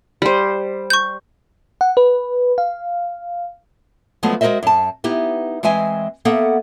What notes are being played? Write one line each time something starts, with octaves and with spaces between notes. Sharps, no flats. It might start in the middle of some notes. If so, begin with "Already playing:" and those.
G3 C5
C#6 G6
F#5
B4
F5
F3 F#3 G#3 A3 B3
G#3 F#4 A#4 C5 D#5 E5
F#2 A5
B3 D#4 E4 G4
E3 G#3 C4 E5 G#5
A#3 B3 A4 E5 F#5